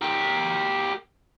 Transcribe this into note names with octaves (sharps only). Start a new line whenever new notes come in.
G4 A#4